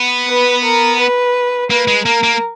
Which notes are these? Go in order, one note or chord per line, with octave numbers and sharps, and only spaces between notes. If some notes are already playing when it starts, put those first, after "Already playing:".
Already playing: B3
B4
A#4
B4
A#3 B4
G#3
A#3 A#4
A#3